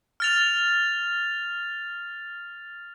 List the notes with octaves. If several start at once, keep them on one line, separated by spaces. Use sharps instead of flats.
F6 A6 F7